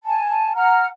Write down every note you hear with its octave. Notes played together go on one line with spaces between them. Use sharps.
G#5 A5
F#5 A#5 F6